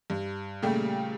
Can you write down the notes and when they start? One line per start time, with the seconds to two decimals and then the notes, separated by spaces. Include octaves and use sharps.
0.10 G2
0.62 A#2 C#3 G3 A3 G4